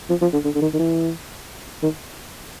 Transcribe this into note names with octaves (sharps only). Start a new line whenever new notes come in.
F3
F3
D3
D3
D3
D#3
D#3
E3
D#3